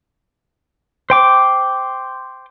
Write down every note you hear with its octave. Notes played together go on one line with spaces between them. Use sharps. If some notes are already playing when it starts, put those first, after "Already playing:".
C5 G5 D6